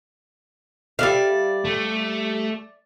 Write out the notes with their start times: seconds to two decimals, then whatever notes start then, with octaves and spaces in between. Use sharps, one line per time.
0.99 G3 D5 E5 F5
1.65 A3